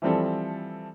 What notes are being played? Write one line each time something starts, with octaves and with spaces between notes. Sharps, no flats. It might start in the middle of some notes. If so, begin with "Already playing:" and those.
E3 F3 G3 C4 A4